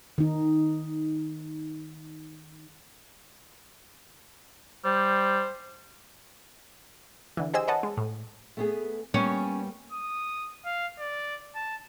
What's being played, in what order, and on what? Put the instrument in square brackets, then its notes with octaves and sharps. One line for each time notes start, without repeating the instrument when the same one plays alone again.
[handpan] D#3 D#4
[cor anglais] G3 [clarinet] C5
[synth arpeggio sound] D3 E3
G4 G#4 C5 D#5 G#5 E6
B4 C#5 D#5 F#5 A5
G#3
A2
[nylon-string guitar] A3 B3 G#4
[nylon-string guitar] G3 A#3 B3 [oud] C#4
[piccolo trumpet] D#6
F5
D5
A5